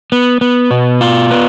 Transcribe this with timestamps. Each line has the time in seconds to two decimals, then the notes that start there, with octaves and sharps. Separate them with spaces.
0.12 B3
0.41 B3
0.71 B2
1.01 F4
1.31 B3